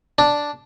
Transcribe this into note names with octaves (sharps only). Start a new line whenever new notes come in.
D4